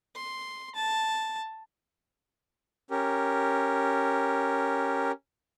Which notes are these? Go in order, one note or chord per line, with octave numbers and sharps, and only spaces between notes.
C6
A5
C#4 G4 A#4